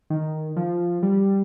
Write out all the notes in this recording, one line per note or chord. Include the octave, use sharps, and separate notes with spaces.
D#3
F3
G3